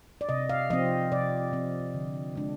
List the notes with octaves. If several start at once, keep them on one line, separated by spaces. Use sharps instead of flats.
D5
C3 D#5
F5
F3 C4 D#5
C3 D5
F3 C4
D3
G#3 D4